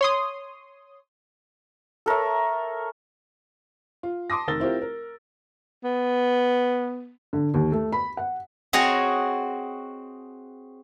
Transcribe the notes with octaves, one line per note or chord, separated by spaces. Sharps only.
C#5 C6 D#6
A4 A#4 C#5 E5
F4
A5 C6 D6 D#6 A#6
F1 D#3 A#4 E6 A6 G7
C4 E4 F4 G4 A#4
A#4
B3
D3
D#2
A3
B5
F#5
C4 F#4 G#4 C#5 D#5 A#5